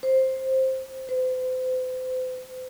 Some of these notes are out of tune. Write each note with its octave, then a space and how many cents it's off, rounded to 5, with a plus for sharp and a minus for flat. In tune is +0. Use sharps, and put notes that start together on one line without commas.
C5 +10
C5 -40